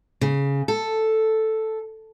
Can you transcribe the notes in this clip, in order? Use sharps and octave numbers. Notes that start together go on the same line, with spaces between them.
C#3
A4